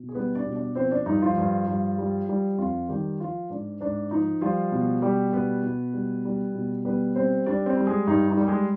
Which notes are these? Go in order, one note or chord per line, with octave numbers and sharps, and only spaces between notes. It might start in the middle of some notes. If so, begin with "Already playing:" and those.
Already playing: B2
G#4
G3 B3 B4
D4 D5
B2
D4 D5
F3 C4 C5
D4
G2 D#4
F3 F4
G2
G2
G3
G3
F2 F3 F4
D#3 G3 G4
F3 F4
G#2 D4
G#2 D4
F3 D#4
F3 G3 F4
B2
G3 G4
B2 B3 B4
B2
G3
G3
B2
G3 B3 B4
G3 C4 C5
G3 D4 D5
C4 C5
G3
G#3 G#4
G2 D#4
D#4
G3
G4
G#3 G#4